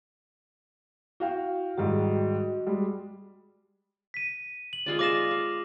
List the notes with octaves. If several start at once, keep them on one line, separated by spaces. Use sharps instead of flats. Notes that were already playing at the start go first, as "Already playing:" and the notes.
E4 F#4 F5 G5
G#2 D#3 G3 F#4 D#5
G3 G#3
B6 D#7
F#7
G#3 F4 D5
D5 F5 D6 A#6 E7
F5